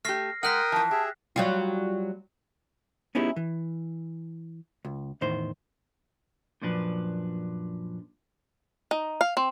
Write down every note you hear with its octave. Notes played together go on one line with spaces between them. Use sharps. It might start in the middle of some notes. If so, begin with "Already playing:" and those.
A3 G4 F6 A#6 C7
G#3 A#4 F#5 G5 D#6 F6 F#6 B6
E3 F3 A5
G4 G#4 E5
F#3 G3 F4
B3 C#4 D#4 E4 G4 G#4
E3
C#2
E2 A2 D#3 C5
F#2 A#2 F3 D4 B4
D#4
F5
C4